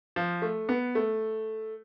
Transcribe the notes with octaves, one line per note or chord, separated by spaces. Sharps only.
F3
A3
B3
A3